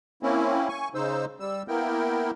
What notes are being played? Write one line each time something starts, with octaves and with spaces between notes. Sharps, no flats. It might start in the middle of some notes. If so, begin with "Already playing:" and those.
A#3 C4 C#4 E4
G#5 C#6
C#3 D#4 C5 E6
G3 E6
A#3 B3 E4 A#4 G5